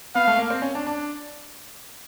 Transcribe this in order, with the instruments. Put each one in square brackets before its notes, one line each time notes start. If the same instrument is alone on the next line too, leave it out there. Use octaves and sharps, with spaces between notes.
[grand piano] B3 [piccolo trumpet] F5
[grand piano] A3
A#3
C4
C#4
D4
D4